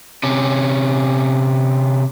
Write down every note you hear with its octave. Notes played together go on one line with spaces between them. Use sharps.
C3 C#4